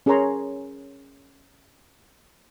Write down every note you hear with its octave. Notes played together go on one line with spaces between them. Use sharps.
C#4 G#4 A#4 C#5 A#5 C6